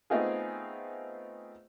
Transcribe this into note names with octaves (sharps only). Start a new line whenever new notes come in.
A3 B3 C4 D#4 F4 G#4